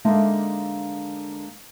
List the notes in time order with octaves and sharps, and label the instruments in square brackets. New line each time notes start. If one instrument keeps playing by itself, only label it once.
[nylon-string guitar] D3 G#3 A#3 D#4 E5 A5